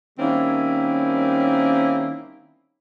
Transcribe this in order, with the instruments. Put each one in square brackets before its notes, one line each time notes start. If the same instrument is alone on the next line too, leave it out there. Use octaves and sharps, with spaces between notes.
[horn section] D#3 G3 A#3 C4 C#4 E4